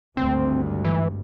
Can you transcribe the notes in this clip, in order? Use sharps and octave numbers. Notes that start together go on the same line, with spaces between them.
G#1 D2 G2 C4
E3